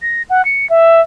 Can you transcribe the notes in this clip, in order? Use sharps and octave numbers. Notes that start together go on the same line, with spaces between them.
A#6
F#5
C#7
E5